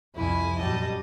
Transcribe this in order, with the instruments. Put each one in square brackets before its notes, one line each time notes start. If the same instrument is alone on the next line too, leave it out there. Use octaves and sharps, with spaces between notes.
[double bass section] C2 F2 [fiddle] E4 G#5
[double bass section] F#2 A#2 G3 [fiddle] D#5 A5